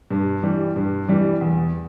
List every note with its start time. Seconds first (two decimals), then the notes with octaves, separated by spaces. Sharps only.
0.11 G2
0.43 E3 G3
0.76 G2
1.08 E3 G3
1.41 E2